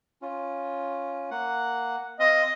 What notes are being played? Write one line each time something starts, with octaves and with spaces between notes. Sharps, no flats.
C#4 F4
A#3 F#5
C4 D#5 F5